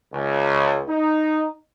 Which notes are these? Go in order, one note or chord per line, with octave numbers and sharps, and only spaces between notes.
C#2
D#4